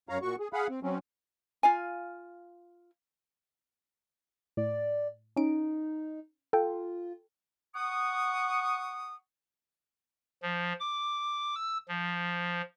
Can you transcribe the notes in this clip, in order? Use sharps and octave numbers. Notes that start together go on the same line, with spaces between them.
F#2 C#5 F5 A#5
A#2 F#4 C#6
G#4
G#4 F5 F#5 B5
C4
F#3 C4 C#4
F4 F5 G#5
A2 D5
C#4 D#4 D7
F4 A4 G5
F#5 C#6 D#6
F3
D6
E6
F3